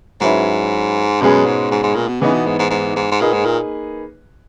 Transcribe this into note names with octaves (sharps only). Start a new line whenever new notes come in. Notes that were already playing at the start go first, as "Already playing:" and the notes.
G#2 F#3 C#4 E4 B4
F#2 B2 G#3 C#4 G#4 B4
G#2
G#2
G#2
A#2
B2
C#3 E3 B3 D#4
B2
G#2
G#2
G#2
G#2
G#2
A#2 A#3 D#4 G#4 B4
G#2
A#2